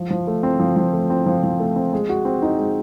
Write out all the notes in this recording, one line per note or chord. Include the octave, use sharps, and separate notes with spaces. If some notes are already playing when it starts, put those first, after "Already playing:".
Already playing: F3
F3
A3
C4
F3
F3
A3
C4
F3
F3
A3
C4
G#3
F#4
C4
D#4
G#3